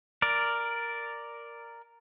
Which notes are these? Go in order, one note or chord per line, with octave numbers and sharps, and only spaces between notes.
A#4 D5